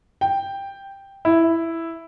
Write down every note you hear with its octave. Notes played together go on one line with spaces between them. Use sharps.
G5
E4